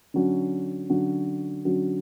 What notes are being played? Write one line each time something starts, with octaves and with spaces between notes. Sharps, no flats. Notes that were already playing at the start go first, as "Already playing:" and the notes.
D3 F#3 C#4 F#4
D3 F#3 C#4 F#4
D3 F#3 C#4 F#4